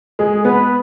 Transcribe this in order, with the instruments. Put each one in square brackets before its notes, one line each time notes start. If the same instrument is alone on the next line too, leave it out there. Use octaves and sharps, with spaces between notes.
[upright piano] G#3 [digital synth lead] G#4
[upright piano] B3 [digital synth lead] B4